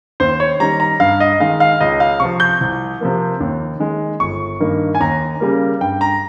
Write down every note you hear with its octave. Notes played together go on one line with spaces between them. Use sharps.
D#2 C5
C#5
D#3 G3 A#5
A#5
G2 F5
D#5
D#3 G#3 F5
F5
C#2 D#5
F5
C3 F3 C#6
G6
C2
C3 F3 A#3
D#2
D#3 G#3
G1 C#6
G2 D#3 A#3
G#5
D#2 A#5
C#3 G3 A#3
G2 G5
A#5